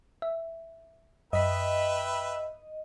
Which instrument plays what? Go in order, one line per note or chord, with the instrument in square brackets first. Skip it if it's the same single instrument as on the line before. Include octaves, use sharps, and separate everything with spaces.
[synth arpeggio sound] E5
[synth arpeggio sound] F#2 B6 [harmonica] B4 E5 G5 [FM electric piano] D#5